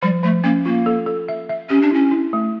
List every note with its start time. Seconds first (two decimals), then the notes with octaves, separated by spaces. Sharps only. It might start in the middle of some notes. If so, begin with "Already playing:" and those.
0.02 F3 G3
0.23 F3 A3
0.44 A#3 C#4
0.65 A#3 F4
0.86 A4
1.06 A4
1.28 E5
1.49 E5
1.70 C#4 G4
1.82 D4
1.91 C#4 E4
2.11 E4
2.33 A3